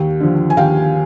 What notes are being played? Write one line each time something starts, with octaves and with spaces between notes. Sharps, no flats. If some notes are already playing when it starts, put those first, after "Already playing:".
Already playing: D#2 G5
D3 F3
G#5
D#2 F5 G5